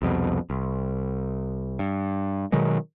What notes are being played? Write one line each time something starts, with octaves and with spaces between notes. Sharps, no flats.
C2 F2 B2
C2
G2
B2 D#3 F#3 G#3